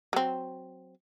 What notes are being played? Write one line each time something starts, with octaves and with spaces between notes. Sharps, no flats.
F#3 C4